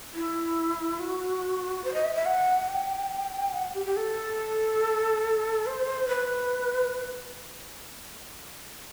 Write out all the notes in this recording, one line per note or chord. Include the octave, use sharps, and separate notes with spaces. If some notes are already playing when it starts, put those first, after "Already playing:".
E4
F#4
C5
D#5
E5
E5
F#5
G5
F#5
G4
G4
A4
C5
B4